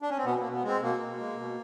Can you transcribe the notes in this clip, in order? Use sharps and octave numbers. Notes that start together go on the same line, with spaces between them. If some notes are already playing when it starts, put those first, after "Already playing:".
D4
C#4
C4
B2 B3
B2 A#3
B3
G#3 C4
B2 A#3
B2
G#3
B2